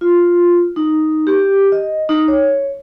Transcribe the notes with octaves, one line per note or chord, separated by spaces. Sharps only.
F4
D#4
G4
D#5
D#4
C#5